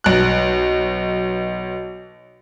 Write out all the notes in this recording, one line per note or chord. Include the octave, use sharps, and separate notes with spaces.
B1 F#6